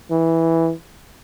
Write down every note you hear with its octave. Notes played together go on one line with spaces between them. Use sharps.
E3